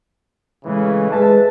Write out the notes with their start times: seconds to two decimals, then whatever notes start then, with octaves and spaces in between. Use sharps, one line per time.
0.65 A2 C#3 E3 G#3
1.12 G#3 B4 E5 A5